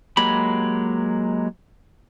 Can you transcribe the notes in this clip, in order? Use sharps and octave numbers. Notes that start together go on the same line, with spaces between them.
F#3 G#3 A#3 G4 B5